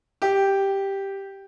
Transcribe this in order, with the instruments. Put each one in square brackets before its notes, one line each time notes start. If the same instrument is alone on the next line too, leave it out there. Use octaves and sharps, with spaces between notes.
[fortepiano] G4